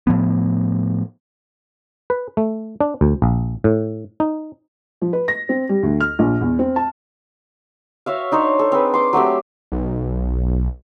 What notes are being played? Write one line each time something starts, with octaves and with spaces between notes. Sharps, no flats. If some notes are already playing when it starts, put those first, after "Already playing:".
A2 F3 B3
B4
A3
D4
D2
A#1
A2
D#4
F3
B4
A#6
C4
G3
D2
F6
A#1
E2
C4
A5
F#4 C#5 E5 F5
D4 D#4 C5 C#5
A4
C4 G#4 B4
C6 D6
F#3 A3 C4 G4
B1